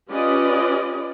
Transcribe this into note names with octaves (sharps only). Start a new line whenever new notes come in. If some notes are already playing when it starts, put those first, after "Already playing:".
C#4 F4 G4 B4 D5 D#5